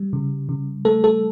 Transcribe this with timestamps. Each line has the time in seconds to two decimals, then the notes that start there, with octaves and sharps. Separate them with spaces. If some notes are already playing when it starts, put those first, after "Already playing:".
Already playing: G3
0.13 C#3
0.49 C#3
0.85 A3 A4
1.04 A4